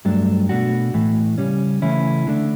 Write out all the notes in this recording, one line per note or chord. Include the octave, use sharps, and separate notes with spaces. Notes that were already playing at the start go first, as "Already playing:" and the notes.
G2 F#3 A3 D4
B2 A3 D4 F#4
A2 E3 A3
C#3 G3 C#4
C#3 E3 A3 C#4 E4
D3 A3 D4